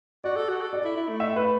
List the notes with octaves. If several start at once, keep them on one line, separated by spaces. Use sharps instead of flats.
F#4 D5
A4
F#4
A4
D5
E4
E4
A3
E5
B4